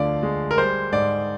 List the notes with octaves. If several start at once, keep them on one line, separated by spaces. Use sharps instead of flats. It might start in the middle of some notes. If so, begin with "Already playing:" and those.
Already playing: D2 D3 F3 D5 F5
G#3
A#4
G3 C5
G#2 D5